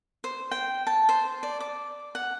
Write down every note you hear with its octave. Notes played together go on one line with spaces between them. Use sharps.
C5
G5
A5
C5
D5
D6
F#5